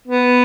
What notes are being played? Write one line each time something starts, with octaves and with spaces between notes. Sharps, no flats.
B3